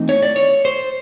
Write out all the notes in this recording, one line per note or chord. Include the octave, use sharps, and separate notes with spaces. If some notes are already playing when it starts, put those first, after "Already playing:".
Already playing: E3 A3 C4 D#4
C#5
D5
C#5
C5